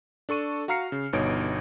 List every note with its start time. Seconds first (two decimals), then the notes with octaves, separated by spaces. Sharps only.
0.29 D4 A4 C#6 D#7
0.68 F#4 F5 A#5 F6 C7 C#7
0.92 C#3
1.13 G1 B2 D#4 C#5 D7